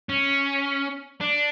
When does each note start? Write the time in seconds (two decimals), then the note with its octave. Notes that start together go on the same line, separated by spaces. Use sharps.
0.09 C#4
1.21 D4